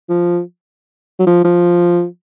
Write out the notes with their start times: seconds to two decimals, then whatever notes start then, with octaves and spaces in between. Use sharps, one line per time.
0.09 F3
1.20 F#3
1.27 F3
1.44 F3